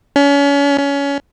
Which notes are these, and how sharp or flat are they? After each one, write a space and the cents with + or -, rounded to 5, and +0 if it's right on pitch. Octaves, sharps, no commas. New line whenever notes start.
C#4 +35
C#4 +25